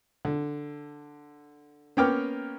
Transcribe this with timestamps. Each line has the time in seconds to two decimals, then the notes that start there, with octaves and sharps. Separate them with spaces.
0.25 D3
1.97 A#3 B3 C#4 G5 D6 F6